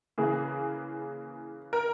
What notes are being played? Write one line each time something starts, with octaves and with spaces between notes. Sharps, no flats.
C#3 E3 A#3 G#4
A#4